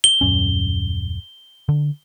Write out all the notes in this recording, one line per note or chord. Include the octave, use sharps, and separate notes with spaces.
G7
D#1 F#2 C#4
D3